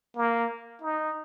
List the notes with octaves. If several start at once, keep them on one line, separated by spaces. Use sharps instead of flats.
A#3
D#4